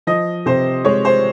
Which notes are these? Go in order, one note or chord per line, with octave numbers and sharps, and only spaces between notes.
F3 D#5
C3 C5
G#3 C#5
C5